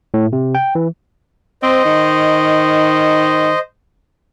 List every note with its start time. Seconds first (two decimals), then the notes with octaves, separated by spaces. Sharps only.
0.14 A2
0.33 C3
0.55 G5
0.75 E3
1.63 C4 C5 D#5
1.85 D#3